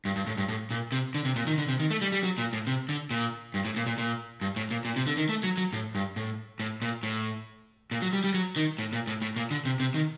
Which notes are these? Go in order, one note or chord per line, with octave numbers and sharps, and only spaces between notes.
G2
G2
A2
G2
A2
A#2
C3
D3
C3
A#2
D#3
D3
C3
D#3
A3
G3
G3
F#3
A#2
A2
C3
D3
A#2
G2
A2
A#2
A#2
A#2
G2
A2
A#2
A#2
C3
D3
D#3
A3
F#3
F#3
A2
G2
A2
A2
A#2
A2
A#2
F#3
G3
G3
F#3
D#3
A2
A#2
A2
A2
A#2
D3
C3
C3
D#3